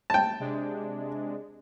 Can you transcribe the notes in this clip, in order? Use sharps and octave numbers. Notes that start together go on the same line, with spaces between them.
G5 A5
C3 G#3 D4